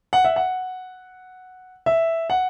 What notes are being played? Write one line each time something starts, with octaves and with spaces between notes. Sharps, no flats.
F#5
E5
F#5
E5
F#5